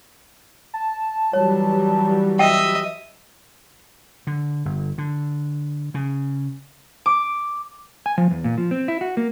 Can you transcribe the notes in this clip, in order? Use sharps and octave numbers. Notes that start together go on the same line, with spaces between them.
A5
E3 F#3 G3 C#5
D#5 E5 G5
D3
G1
D3
C#3
D6
G#5
F3
E2
A#2
F3
C4
E4
F#4
A#3